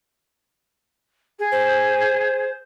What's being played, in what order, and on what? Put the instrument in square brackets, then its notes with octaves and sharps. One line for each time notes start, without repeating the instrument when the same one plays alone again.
[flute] G#4
[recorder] C5